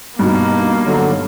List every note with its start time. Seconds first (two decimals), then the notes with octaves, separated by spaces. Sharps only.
0.19 G2 B2 A#3 D#4
0.86 D3 F#3